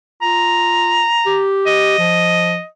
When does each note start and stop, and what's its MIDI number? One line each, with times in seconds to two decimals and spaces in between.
0.22 1.06 65
0.22 1.46 82
1.26 1.94 67
1.67 2.66 75
1.99 2.58 53